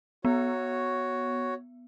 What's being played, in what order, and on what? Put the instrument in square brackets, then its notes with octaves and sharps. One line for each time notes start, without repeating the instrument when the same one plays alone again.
[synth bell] B3 [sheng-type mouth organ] F#4 C#5